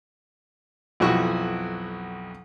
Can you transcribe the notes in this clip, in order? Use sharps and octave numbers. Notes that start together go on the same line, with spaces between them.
B1 F2 E4 F#4 C#6 E6